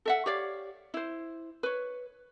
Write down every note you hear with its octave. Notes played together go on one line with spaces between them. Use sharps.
A4 E5 F#5
G4 C#5 D5 F5
E4 C5
B4 C#5